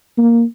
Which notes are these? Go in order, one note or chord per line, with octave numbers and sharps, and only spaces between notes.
A#3